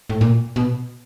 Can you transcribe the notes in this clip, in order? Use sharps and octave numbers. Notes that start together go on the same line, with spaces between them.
A2
A#2
B2